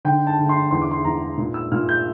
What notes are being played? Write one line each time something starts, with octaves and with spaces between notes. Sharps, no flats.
D3 G5
A5
D3
C6
E2 C6
D6
C6
E2 A#5
A#2
E6
A#2 F6
G6